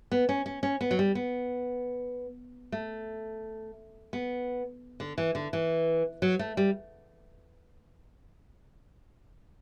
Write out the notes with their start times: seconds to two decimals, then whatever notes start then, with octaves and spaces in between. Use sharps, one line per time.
0.11 B3
0.29 C#4
0.46 C#4
0.63 C#4
0.81 B3
0.91 F#3
0.99 G3
1.15 B3
2.72 A3
4.13 B3
5.00 D3
5.18 E3
5.35 D3
5.53 E3
6.22 F#3
6.39 A3
6.57 G3